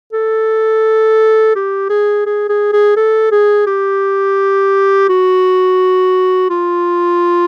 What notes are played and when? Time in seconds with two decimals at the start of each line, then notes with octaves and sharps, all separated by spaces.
0.12 A4
1.55 G4
1.89 G#4
2.26 G#4
2.49 G#4
2.73 G#4
2.96 A4
3.31 G#4
3.67 G4
5.09 F#4
6.50 F4